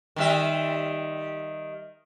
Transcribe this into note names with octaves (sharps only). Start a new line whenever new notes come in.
D#3 G3 E5